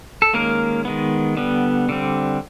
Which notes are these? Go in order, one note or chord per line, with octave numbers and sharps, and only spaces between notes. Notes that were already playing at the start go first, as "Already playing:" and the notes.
A4
D#3 G#3 A#3 C#4 A#4
D#3 G#3 B3
D3 G3 B3
D3 G3 C4